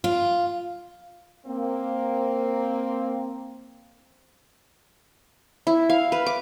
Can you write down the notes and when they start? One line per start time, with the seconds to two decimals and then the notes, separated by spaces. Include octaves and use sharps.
0.04 F4
1.46 A#3 C4
5.67 E4
5.90 F5
6.12 B4
6.26 D6